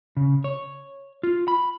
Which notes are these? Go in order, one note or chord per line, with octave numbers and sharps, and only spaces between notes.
C#3
C#5
F4
B5